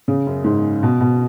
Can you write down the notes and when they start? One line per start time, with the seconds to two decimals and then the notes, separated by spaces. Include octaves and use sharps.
0.08 C#3
0.27 F#2
0.44 G#2
0.83 B2
1.01 B2